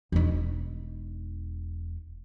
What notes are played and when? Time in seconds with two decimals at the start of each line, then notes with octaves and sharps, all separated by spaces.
0.12 E1 D#4